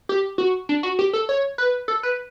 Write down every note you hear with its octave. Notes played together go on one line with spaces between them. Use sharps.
G4
F#4
D4
F#4
G4
A4
C#5
B4
A4
B4